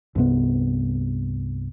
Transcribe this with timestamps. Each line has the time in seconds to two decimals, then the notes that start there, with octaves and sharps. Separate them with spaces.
0.15 C2 G2 C3 B3